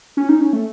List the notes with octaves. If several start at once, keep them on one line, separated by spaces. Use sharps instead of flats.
C#4
D#4
C#4
A3